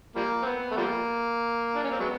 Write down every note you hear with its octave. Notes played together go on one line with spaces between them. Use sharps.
F3 G3 A#3
C4
B3
A3
F3 G3 A#3
D4
C#4
C4
F#3 G#3 B3